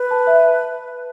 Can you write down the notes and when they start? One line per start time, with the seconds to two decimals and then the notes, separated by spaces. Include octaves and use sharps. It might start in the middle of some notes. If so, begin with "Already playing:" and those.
Already playing: B4
0.11 A5
0.27 E5